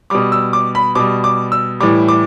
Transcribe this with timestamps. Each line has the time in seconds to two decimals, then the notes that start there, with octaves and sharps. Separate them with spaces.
0.10 B2 G3 D6
0.32 E6
0.53 D6
0.75 B5
0.95 B2 G3 D6
1.24 D6
1.52 E6
1.80 A2 E3 G3 D6
2.08 D6